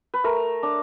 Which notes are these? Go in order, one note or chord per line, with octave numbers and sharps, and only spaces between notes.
B4
A3 A#4
D4